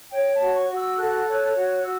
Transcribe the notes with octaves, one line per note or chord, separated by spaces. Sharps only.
C#5 G5
A5
F#4
C#6
F#4
E6
A4 F#6
C#5
F#6
F#4
F#4 E6